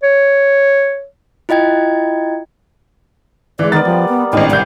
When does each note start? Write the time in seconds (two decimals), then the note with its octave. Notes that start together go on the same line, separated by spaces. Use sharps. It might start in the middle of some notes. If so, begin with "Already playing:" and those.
0.03 C#5
1.49 E4 F4 D#5 G5 G#6
3.59 E3 G#3 D5
3.72 D#3 B3 A#4 D5 A6
3.85 F3 G3
4.09 B3
4.33 G#1 A2 G3 D4 D#5
4.50 C2 D5 G6